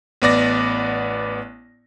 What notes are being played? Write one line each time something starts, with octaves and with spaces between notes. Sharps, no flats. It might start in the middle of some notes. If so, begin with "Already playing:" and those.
A1 B3 D5 A#6